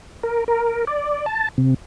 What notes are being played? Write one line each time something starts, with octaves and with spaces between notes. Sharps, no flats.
A#4
A#4
D5
A5
C3